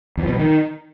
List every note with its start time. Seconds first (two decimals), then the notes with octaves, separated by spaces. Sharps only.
0.17 E2
0.23 F3
0.29 B2
0.34 F#3
0.40 D#3